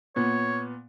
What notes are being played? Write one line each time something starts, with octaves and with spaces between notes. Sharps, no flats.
A#2 B3 C#5